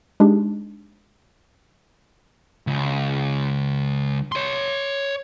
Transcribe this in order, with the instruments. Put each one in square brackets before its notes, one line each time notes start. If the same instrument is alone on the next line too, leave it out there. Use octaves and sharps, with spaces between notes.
[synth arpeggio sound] G#3 D4 D#4 G4 G#4
[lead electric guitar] C#2
C#5 C6